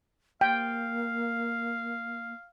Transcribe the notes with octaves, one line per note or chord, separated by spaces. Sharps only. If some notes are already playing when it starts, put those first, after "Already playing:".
A#3 F5 G5